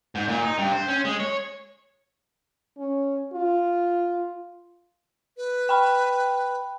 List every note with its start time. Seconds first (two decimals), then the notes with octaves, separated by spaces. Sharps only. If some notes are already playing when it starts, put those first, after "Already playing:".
0.15 G#2
0.28 A#2
0.43 D#4
0.58 G2
0.72 C5
0.88 C#4
1.05 G#3
1.20 C#5
2.78 C#4
3.33 F4
5.37 B4
5.69 G5 B5